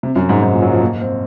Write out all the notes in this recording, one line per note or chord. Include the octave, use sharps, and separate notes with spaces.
C3
F#2
G#2
G#2
A#2
F#3
F3
A#3
C4